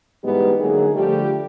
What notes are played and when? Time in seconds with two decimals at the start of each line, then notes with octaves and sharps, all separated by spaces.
0.23 G#2 E3 G3 G#3 B3 D#4 G4
0.59 D3 F#3 G#3 A#3 D#4 G#4
0.93 D3 F3 G3 A3 G4